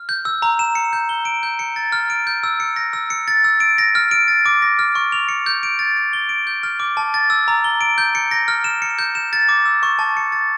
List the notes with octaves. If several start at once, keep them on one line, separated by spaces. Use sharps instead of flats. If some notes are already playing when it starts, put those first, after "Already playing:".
Already playing: F6
G6
E6
A#5
E7
C#7
G6
G7
D7
G6
C#7
A6
F6
D7
G6
E6
C#7
A#6
E6
C#7
A6
E6
D7
A#6
F6
D7
A6
D6
A#6
F6
C#6
F7
C#7
G6
D7
A6
D6
G7
D7
G6
F6
D6
A5
A6
E6
A#5
G7
D7
G6
C#7
A#6
F6
E7
C#7
G6
E7
A6
D6
E6
C#6
A5
C#7
A6